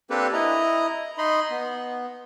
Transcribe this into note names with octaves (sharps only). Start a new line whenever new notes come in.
A#3 C4 D4 G4 A4 B4
E4 D#5 A#5
D#4 D#5 B5 C6
B3